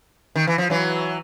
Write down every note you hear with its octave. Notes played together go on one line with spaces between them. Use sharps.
D#3
E3
F3
E3 F#3